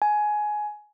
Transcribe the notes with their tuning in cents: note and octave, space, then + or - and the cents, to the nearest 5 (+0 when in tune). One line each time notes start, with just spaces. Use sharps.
G#5 +15